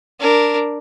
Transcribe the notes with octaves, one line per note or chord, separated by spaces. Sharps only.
D4 A#4